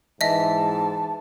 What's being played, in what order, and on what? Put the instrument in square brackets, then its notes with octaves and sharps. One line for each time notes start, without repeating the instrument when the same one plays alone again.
[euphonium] G#2 [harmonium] E3 [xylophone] D#5 E5 [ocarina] A5